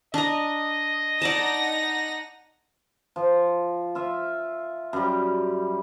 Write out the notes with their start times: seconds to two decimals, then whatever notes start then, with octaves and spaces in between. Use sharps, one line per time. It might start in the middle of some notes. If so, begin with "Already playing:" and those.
0.14 D4 D#5 A#5
1.22 D#4 D5 F#5 A5 A#6
3.16 F3
3.95 F4 E5
4.93 F#2 G3